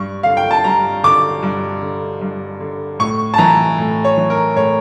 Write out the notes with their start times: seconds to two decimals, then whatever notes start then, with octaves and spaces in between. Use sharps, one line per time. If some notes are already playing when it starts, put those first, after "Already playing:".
Already playing: G2 C#6
0.23 D3 F5
0.37 G5
0.51 A5
0.64 G2 A#5
1.04 D3 D6
1.43 G2
1.82 D3
2.21 G2
2.60 D3
2.99 A2 C#6
3.34 A5
3.38 E3 A#5
3.78 A2
4.04 C#5
4.17 E3
4.30 A#4
4.56 A2 C#5